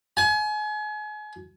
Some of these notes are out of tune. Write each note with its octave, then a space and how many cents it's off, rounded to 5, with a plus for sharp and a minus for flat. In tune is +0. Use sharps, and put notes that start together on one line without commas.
G#5 +35